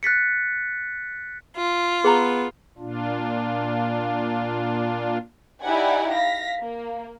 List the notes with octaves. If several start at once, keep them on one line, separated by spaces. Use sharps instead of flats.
F#6 A6 B6 C#7
F4
B3 G#4 A#5
A#2 D4 F4
D#4 E4 G4 D5 F#5 G#5
F5 A#6 B6
A#3